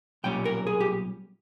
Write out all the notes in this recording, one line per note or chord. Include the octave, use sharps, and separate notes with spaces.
B1 A#2 G3 C#4 G5
A#4
G#4
G4